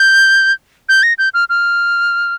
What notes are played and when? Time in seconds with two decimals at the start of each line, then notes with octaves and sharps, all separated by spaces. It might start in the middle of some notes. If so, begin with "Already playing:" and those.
Already playing: G6
0.89 G6
1.03 A#6
1.18 G6
1.34 F6
1.49 F6